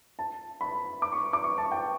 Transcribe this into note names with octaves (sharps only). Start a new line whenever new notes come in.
A5
B5
D6
C#6
D6
C#6
A5
G5